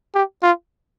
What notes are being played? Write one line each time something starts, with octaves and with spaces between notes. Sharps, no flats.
G4
F4